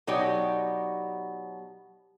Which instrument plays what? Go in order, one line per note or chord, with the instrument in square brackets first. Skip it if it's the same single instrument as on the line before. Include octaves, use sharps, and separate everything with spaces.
[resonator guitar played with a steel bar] B2 F#3 D#4 G4 C#5 D5